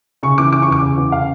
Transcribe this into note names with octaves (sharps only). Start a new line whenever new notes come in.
C#3 C#6
E3 D6
C#3 D6
C#6
E2 D6
C#3
E2
C#3 F5